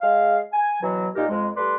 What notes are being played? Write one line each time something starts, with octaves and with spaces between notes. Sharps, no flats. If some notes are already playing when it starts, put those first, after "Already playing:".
G#3 F5
G#5
B2 E3 F#3
A#2 D#4 F4 G4 A#4
F2 G#3
G3 A3 B4 D5 C6